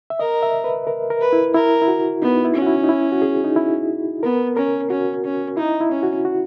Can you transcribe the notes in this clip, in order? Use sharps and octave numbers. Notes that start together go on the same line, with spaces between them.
E5
A#4 D#5
E5
B4
A#4
A#4
B4
E4
E4 A#4
E4
F#4
B3 D#4
E4
C#4
F#4
E4
D#4
E4
F#4
G#4
D#4
E4
B3 A#4
C#4 A#4
C#4 F#4
C#4
D#4 E4
E4
C#4
F#4
F#4